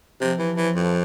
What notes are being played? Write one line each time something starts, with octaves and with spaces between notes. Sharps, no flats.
C3 F3
E3
E3
F2